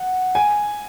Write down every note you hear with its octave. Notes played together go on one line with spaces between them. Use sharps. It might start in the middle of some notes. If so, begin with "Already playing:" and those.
Already playing: F#5
G#5